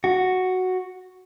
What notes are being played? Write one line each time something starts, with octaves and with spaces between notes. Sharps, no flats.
F#4